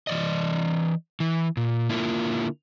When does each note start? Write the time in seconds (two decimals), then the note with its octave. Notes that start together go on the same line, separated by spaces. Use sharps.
0.07 E3 D5 D#5
1.20 E3
1.57 A#2
1.89 D3 A#3 E4 F4 A#4